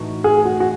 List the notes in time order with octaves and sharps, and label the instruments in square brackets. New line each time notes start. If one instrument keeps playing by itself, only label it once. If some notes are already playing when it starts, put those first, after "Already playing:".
Already playing: [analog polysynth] A2 E3 A3 D#4 F#4
[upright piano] G#4
F#4
F#4